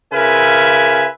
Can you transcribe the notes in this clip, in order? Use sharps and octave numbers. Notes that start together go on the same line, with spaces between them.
C#3 F4 A#4 B4 E5 G#5